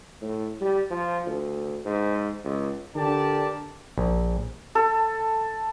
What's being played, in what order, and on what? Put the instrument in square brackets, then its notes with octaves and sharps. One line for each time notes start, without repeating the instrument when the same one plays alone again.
[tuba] A2
G3
F3
D2
G#2
C#2
[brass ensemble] D3 G4 A#4 D5 A5
[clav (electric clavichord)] A#1
[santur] A4